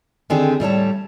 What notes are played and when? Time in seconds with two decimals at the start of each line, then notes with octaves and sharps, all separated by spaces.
0.30 D3 D#3 C4 D4 G4 G#4
0.60 A2 G3 C#5 A5